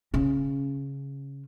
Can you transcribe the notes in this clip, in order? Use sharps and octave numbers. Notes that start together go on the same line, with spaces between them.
C#3 C#4